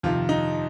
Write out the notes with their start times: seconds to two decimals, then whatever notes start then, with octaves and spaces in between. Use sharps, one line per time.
0.03 F2 C3 D#3 F4
0.29 D#4